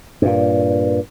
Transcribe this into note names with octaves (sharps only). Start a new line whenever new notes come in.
G2 A#2